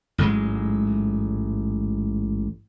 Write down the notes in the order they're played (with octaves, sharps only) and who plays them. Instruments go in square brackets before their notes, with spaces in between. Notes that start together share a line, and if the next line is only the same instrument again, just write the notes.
[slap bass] A1 G#2 F#3 G#3